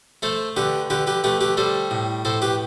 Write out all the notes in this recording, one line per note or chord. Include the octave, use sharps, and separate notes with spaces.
A3 A4 C5
D3 G4 B4
D3 G4 B4
G4 B4
A3 G4 B4
G4 B4
G3 A4 C5
A2
A2 A4 C5
G4 B4